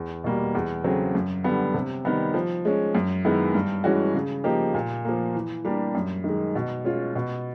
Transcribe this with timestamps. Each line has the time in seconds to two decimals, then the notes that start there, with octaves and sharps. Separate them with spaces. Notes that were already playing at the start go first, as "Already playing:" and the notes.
Already playing: E2
0.24 B2 G3 A#3
0.55 E2
0.84 C#3 F#3 A3 C4
1.15 F#2
1.44 D3 G3 B3
1.74 C3
2.05 D#3 G3 B3
2.34 F3
2.65 G#3 C#4
2.95 F#2
3.25 D#3 G#3 B3 E4
3.54 G2
3.84 E3 G#3 C#4 F#4
4.14 C#3
4.44 F3 A#3 D#4 G4
4.74 A#2
5.05 F3 A#3
5.35 E3
5.65 G3 A#3 D4 G4
5.95 F#2
6.24 D#3 G#3
6.55 B2
6.84 G#3 C#4 F4
7.15 B2